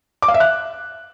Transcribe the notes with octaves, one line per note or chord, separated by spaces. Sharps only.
D6
F5
E5
F#6